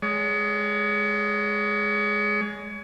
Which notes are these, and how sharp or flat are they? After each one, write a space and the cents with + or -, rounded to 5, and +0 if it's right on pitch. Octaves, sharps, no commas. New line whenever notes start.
G#3 +0 C#5 +40